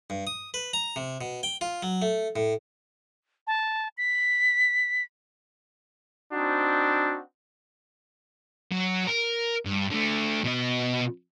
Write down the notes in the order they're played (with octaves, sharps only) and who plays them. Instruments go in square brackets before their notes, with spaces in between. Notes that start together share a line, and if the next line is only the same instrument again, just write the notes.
[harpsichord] G2
D#6
B4
A#5
C3
B2
G5
F4
F#3
A3
A2
[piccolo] A5
B6
[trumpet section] C4 D4 D#4 F#4
[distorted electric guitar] F#3
A#4
G2
D3 A3
B2 D#5